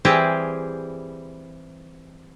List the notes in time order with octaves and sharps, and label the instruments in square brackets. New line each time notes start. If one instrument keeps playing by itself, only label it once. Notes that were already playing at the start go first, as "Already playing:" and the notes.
[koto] E3 G3 C4 G4 G#4